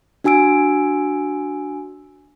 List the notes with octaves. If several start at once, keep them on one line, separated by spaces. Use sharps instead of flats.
D4 F#4 G#5 E6 D7